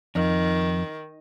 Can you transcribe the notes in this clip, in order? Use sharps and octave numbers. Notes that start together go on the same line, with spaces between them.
F2 D#3